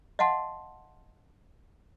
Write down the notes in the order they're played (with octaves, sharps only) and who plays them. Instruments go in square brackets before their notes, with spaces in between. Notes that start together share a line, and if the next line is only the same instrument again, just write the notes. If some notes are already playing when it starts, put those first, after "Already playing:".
[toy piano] D#5 F5 F#5 A5 C6